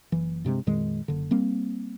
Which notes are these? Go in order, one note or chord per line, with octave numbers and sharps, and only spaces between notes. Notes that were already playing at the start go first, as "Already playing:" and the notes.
F#1 E3
G2 C3 G3 G#3
F2 A#2 D#3 G#3
F#1 D3
G3 A#3 C4